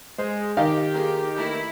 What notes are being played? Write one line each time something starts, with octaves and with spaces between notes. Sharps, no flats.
G#3 C5
D#3 G4 D#5 F5
A#3 F4 G#4
E3 A3 A#3 E4